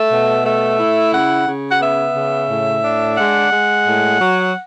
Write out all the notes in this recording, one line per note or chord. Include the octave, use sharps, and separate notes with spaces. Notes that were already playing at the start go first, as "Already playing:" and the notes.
Already playing: A3 E5
B2
A3 E5
E4
C#3 F#5
C#3
F#5
B3 E5
C#3
A2
D4
G#3 F#5
G#3
A2
F#3